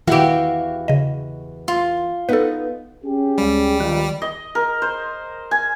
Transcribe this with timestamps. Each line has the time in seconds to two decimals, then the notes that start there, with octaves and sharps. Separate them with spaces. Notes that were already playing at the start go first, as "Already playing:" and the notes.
0.07 E2 D#3 E4 F#4 G4 E5 F5
0.88 C#3 D#5
1.68 F4
2.29 B3 D#4 A4 B4
3.04 C#4 G4 G#4
3.38 D2 G3 G#3
3.80 A#1 G2 A#2 D#3 G4
4.22 D#5
4.55 A#4
4.82 C5
5.51 G#5